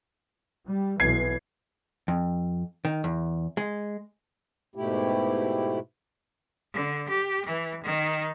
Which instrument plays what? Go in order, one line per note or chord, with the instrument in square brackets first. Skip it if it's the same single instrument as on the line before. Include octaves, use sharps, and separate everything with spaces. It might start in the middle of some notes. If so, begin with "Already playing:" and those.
[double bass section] G3
[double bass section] B1 B2 E3 [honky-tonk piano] G#6 C7
[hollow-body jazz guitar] F2
D#3
E2
G#3
[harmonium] G#2 B2 A3 E4 G4
[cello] D3
G4
E3
D#3